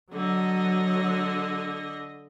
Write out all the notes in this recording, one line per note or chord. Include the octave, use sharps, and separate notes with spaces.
D3 F#3 D#5